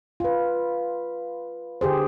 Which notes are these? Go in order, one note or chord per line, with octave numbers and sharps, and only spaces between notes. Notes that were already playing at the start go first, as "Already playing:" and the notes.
F4 B4
D3 G4 G#4 C5